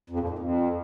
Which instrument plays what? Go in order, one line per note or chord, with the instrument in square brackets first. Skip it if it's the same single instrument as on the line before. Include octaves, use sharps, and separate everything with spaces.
[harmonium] F2
A#2
G#2
F2